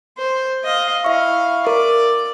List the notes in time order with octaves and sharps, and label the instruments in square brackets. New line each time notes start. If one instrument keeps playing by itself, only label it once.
[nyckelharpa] C5
D#5 F5
[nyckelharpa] E4 F5 [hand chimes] E5 C#6
[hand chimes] A#4 [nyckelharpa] D5